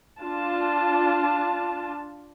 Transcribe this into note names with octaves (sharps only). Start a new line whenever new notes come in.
D4 F4 A5